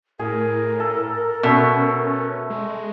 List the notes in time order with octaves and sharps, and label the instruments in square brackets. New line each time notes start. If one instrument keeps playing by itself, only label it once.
[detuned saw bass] A2 [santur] G#4 [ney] A#4
[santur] A4
[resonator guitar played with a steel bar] B2 [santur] A3 [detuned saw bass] C#4
[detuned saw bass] G#3